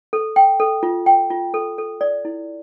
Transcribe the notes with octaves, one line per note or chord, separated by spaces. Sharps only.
A4
G5
A4
F4
G5
F4
A4
A4
D5
E4